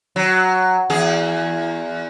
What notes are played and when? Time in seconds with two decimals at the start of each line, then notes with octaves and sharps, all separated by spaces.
0.16 F#3
0.90 E2 G#4